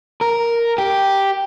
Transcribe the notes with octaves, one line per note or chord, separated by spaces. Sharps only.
A#4
G4